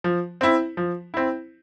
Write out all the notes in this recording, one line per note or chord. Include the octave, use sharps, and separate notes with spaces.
F3
C4 E4
F3
C4 E4